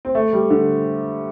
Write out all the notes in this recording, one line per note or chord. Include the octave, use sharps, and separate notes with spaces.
C4
A3
G3
D3